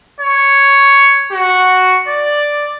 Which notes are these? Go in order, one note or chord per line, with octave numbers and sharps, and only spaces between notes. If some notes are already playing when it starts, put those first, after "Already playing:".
C#5
F#4
D5